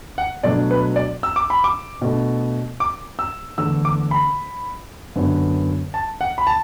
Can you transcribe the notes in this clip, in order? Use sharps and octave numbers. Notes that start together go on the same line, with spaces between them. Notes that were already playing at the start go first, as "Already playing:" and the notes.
F#5
B2 F#3 A3 D4 D5
B4
D5
E6
D6
B5
D6
B2 A3 D4
D6
E6
E2 D3 A3 D4 E6
D6
B5
F#2 D3 B3 D4
A5
F#5
B5
A5